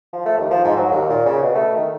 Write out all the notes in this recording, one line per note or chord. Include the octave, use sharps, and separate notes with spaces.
F3
A3
D#2
F3
G#2
F#3
D#2
A#2
C#3
B2
A3
D#3